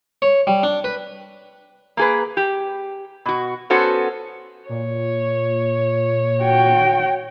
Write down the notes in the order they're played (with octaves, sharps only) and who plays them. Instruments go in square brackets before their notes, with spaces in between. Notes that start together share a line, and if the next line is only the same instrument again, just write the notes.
[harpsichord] C#5
G3
D4
B4
[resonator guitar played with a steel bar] A#3 G#4 B4
G4
B2 F#4
B3 C#4 F#4 A4 C5
[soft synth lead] A#2 [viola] C#5
[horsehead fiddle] F#4 G5